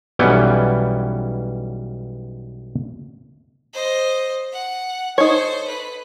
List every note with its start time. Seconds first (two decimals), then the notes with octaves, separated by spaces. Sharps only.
0.19 B1 E3 G3 B3 C#4 G5
3.74 C5 D#5
4.53 F#5
5.18 D#4 A4 C5 C#5
5.68 B4